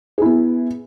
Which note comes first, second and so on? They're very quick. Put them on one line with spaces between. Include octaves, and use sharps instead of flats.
G#4 E4 B3